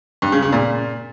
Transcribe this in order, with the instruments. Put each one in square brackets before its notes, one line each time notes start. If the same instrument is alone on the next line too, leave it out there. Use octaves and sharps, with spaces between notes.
[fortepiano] G2
C#3
C#3
A#2